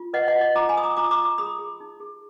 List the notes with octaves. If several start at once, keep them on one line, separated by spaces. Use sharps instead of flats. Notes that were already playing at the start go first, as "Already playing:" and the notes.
Already playing: F4
B4 D#5 F#5
D#5 F#5
F4
D#5
F4 A#5 D6
G#5 B5
F4 D#6
A#5 D6
F4 A#5 D6
D#6
A#5 D6
F4
A#5 D6
G#4 B5 D#6
G#4
D#4
G#4